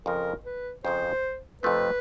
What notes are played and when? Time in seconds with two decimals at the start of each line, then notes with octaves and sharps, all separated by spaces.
0.06 F2 C#3 F3 A#4
0.45 B4
0.85 F2 C#3 F3 C5
1.63 F2 C3 F3 A3 C4 B4